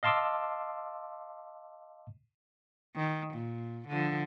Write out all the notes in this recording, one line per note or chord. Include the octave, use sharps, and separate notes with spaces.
D#5 F5 A5 C6 D6 E6
D#3
A#2
D3 F3